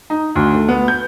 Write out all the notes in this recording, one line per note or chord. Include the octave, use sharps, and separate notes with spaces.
D#4
D2
A3
B3
G6